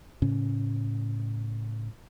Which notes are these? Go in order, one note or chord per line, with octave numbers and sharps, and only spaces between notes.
A2 C#3 C#4